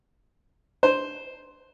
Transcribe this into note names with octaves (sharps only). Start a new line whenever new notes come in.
C5